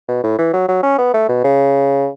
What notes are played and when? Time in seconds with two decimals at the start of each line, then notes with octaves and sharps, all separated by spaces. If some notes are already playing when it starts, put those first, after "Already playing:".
0.08 B2
0.23 A2
0.39 E3
0.53 F#3
0.68 F#3
0.83 C#4
0.98 B3
1.14 A3
1.29 B2
1.44 C#3